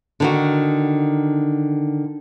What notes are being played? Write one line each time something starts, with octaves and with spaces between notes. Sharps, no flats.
D3 D#3 F#4